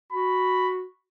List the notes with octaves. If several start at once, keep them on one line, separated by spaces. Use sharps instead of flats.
F#4 B5